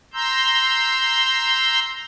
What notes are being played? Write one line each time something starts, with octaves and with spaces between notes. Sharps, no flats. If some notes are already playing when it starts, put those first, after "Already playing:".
A#5 C6 E6 G6